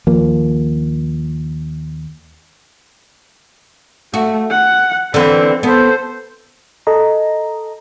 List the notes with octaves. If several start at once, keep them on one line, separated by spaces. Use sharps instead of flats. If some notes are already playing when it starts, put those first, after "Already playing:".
D#2 F3 A#3
A3 F#4
F#5
D3 E3 C4
B3 A4 C5
A4 D#5 A#5